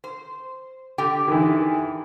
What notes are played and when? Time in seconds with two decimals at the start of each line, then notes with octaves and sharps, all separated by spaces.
0.04 C5
0.98 D3 G4 G5
1.28 D#3 E3